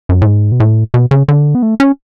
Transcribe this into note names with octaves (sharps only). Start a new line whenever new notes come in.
F#2
A2
G#2
B2
A2
B2
C#3
D3
B3
A3
C#4